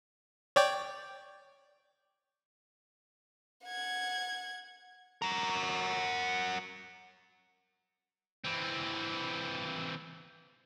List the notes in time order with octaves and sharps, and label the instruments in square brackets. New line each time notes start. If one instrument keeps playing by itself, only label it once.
[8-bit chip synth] C#5 D5 G5
[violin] F#5 G#6
[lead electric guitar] F#4 A#4
[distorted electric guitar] E3 C4